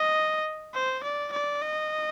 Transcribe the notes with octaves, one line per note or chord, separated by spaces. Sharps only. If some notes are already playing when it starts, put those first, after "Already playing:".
Already playing: D#5
C5
D5
D5
D#5